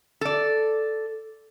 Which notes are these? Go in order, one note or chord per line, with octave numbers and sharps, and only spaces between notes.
A4 D5